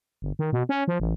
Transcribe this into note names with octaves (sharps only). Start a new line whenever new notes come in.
G1
D#3
B2
C#4
F3
A1